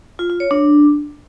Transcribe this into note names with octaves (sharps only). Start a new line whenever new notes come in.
F4
F4
C#5
D4